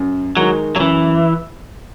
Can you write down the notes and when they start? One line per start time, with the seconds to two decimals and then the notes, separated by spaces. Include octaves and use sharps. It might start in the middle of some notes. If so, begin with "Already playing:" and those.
Already playing: F#2
0.37 D#3 F#3 G#3 D#4
0.76 F#3
0.80 F#2 E3